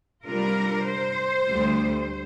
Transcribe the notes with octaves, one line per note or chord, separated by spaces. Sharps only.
C3 G3 D4 F4 A#4
C5
D2 D3 G3